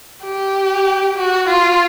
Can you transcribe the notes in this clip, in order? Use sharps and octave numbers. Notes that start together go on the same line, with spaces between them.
G4
F#4
F4